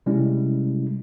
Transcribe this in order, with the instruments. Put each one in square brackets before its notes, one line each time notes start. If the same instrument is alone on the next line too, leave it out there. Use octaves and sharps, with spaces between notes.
[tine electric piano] C3 G3 G#3 C#4 E4